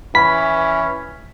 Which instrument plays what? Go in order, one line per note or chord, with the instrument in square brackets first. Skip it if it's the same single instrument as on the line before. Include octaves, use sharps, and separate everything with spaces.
[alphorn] E3 [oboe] C#4 [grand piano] B5 [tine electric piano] B6